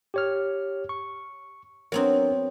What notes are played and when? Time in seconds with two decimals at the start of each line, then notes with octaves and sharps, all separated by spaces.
0.14 G4 C#5 F6
0.89 C#6
1.92 F#3 B3 C4 D4 A#4